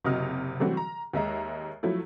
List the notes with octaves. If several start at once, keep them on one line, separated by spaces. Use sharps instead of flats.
F#1 C3 F#4 D#5 D#6 F6
E3 F#3 G3 A3 C4 F#4
A#5
D#2 G#3 E5 A#5
F3 F#3 A3 E4